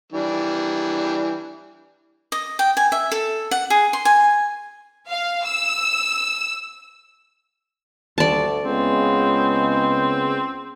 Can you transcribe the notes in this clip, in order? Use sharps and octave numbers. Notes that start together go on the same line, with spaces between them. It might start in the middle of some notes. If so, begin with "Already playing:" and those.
E3 G3 D4
D#5
G5
G#5
E5
A4
F#5
G#4
C6
G#5
F5
E6
D2 G2 D5 A5
C#2 C#3 G#3 B3 C4